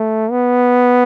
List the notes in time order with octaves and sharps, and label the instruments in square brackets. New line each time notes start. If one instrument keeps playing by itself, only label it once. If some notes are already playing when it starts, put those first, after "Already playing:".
Already playing: [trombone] A3
B3